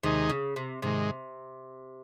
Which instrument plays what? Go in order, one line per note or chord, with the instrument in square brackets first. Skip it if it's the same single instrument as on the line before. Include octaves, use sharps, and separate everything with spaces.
[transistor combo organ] D#2 D#3 G#3 D#4 G#4 [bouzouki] C3
[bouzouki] C#3
C3
[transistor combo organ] G#2 D#3 G#3 [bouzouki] C3